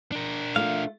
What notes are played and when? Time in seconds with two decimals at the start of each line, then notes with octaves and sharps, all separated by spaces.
0.12 D4 A#4
0.56 A3 F4 F5